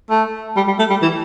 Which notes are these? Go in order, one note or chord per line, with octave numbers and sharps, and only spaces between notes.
A3
G3
G3
A3
G3
E3